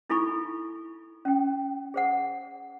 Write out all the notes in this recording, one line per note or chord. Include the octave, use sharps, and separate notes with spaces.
D#4 E4 A4 G#5 B5 C#6
C#4 G5
G#4 C5 F#5